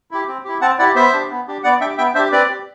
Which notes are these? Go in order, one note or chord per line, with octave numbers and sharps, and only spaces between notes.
E4 G4
C4
E4 G4
C4 F#5 A5
E4 G4 D5 F#5
B3 C5 E5
D4 G4
B3
D4 G4
B3 D5 F#5
D4 G4 E5 G5
B3 E5 G5
D4 G4 C5 E5
C4 B4 D5
G4